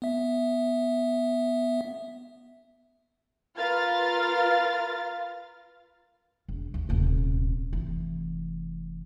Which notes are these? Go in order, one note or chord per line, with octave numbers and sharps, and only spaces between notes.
B3 E5
F4 A#4 B4 F5 F6 A6
E1
D#2
D#1 C3
F1 E3